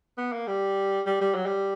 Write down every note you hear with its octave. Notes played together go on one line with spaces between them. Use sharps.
B3
A#3
G3
G3
G3
F#3
G3